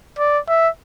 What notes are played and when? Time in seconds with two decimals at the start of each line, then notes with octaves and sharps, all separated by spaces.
0.19 D5
0.48 E5